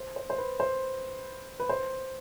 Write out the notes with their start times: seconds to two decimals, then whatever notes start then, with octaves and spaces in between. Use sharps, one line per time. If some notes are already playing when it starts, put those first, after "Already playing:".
Already playing: C5
0.16 C5
0.30 C5
0.38 B4
0.60 C5
1.60 B4
1.69 C5